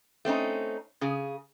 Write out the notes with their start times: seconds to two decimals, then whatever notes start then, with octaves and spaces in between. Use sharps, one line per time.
0.25 A3 C4 C#4 D#4
1.01 C#3 G#4